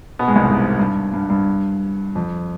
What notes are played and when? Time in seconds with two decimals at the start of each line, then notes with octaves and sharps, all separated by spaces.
0.19 B2 B3
0.27 G#2 G#3
0.36 C2 C3
0.45 G#1 G#2
0.79 G2
1.14 G2
1.30 G2
2.15 F2